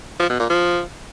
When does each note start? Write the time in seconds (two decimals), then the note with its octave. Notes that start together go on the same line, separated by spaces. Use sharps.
0.20 F3
0.30 B2
0.40 A#2
0.50 F3